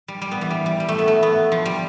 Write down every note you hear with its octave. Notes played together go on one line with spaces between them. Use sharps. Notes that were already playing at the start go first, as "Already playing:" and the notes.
G3
G3
B3
E3
G3
G3
G3
A3
B3
A3
B3
F3
G3